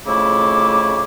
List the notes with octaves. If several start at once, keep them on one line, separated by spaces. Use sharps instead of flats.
F2 C#3 A3 E4 D6